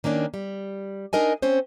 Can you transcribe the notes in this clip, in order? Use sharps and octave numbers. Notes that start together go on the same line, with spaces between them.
D#3 A#3 C#4 D4
G3
D4 D#4 A#4 D#5 G#5
C4 C#4 C5